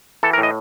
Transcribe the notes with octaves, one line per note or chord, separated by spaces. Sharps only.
E3 A4
A#4
A2
D#5